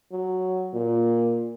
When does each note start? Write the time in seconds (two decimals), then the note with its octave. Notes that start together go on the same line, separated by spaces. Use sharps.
0.12 F#3
0.74 A#2